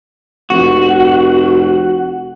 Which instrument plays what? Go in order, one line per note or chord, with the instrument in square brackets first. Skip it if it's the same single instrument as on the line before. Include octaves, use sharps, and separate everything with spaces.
[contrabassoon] F1 [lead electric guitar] F#4